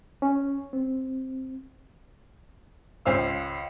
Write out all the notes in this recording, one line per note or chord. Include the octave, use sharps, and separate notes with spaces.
C#4
C4
C#2 C#4 C5 F5 E6